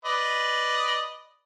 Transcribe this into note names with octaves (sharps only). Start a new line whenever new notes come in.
B4 D5 D#5